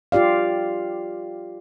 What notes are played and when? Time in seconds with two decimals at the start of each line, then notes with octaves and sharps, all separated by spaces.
0.12 F4 G4 D5 F5